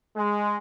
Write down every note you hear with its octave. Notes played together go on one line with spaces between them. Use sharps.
G#3